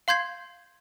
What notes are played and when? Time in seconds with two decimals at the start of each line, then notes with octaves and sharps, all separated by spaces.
0.08 F5 C6 G6 G#6 C7